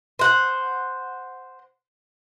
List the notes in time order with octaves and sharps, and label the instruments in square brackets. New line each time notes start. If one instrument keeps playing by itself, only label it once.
[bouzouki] C5 F#5